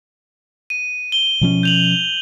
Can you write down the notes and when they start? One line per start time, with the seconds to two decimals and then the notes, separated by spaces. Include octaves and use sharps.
0.70 D#7
1.12 G7
1.41 B2 F3 C#4
1.63 G6 F7 F#7